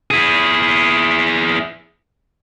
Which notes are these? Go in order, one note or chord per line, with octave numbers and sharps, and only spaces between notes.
E4 G#4